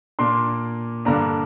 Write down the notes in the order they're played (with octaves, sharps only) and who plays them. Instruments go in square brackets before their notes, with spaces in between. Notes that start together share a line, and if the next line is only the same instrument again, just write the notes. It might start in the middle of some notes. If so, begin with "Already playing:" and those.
[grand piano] A#2 A#3 D4 C6
G2 D3 A#3 D4 A#5